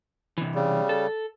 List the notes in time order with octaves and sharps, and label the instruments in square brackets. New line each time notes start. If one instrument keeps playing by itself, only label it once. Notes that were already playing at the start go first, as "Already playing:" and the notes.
[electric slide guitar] C3 E3
[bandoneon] C#3 G3
[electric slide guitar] A4